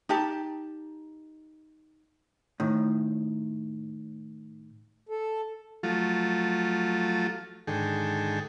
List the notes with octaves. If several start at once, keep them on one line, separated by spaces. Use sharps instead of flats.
D#4 G4 A5
A2 D#3
A4
F3 F#3 A3 F4
G#2 D3 D#3 G#4 A4 G5